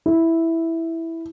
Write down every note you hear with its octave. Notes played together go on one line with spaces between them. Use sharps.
E4